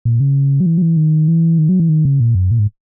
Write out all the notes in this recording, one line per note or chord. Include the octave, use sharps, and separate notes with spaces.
A#2
C#3
F#3
E3
F#3
E3
D#3
E3
D#3
F#3
E3
D#3
C#3
A#2
F#2
A#2
G#2